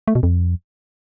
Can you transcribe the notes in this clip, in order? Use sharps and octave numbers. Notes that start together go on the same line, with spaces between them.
A3
B2
F2